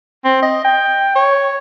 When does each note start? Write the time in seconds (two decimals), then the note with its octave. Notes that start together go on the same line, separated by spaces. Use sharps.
0.25 C4
0.42 D#5
0.65 G5
1.16 C#5